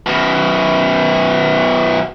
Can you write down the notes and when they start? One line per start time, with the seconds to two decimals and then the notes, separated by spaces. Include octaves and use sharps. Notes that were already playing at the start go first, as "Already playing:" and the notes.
0.06 F#2 B2